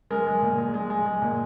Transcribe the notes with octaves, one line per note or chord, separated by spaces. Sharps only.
G#3 A#4
G#3
A#2
G#3
G#3
G#3
G#3
A#2